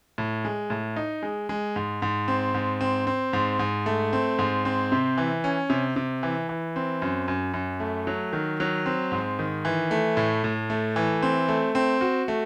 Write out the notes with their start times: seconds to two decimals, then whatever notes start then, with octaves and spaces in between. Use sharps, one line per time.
0.18 A2
0.45 G#3
0.70 A2
0.96 D#4
1.23 G#3
1.49 G#3
1.76 G#2
2.02 G#2
2.28 C4
2.54 G#2
2.81 C4
3.07 C4
3.33 G#2
3.59 G#2
3.86 A3
4.13 C4
4.39 G#2
4.65 C4
4.92 C3
5.18 E3
5.44 C#4
5.70 C3
5.96 C3
6.23 E3
6.49 E3
6.76 C4
7.02 F#2
7.28 F#2
7.54 F#2
7.80 A3
8.07 F#3
8.33 D#3
8.60 F#3
8.86 C4
9.12 G#2
9.39 D#3
9.65 E3
9.91 A3
10.17 A2
10.44 A2
10.70 A3
10.96 E3
11.22 C4
11.48 A3
11.75 C4
12.01 F#4
12.28 A3